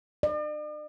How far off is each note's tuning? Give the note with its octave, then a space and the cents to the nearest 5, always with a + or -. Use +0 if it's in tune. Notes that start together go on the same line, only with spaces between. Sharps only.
D5 +45